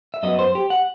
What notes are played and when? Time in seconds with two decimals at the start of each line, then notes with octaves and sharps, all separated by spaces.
0.14 E5
0.23 F#2 F#3 B3 D#5
0.39 C5
0.55 G4
0.70 F#5